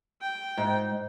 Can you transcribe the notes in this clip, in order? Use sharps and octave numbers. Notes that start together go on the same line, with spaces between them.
G5
G#2